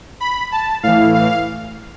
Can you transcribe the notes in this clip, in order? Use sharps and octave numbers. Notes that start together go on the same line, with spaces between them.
B5
A5
A2 E3 F5
F5